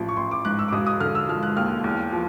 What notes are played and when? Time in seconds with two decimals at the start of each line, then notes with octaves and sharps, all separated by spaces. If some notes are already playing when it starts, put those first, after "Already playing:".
Already playing: A1 F3
0.09 C#6
0.17 A1 C6
0.31 D6
0.45 G#2 F#6
0.59 E6
0.68 D6
0.73 E1 D#6
0.87 D#6
1.00 D3 F6
1.15 E6
1.28 F3 F6
1.43 F#6
1.57 D#2 F6
1.84 E2
2.12 F3